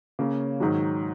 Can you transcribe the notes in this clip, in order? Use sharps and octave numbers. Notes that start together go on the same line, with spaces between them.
C#3 A#3 C#4
G#2 D#3 F#3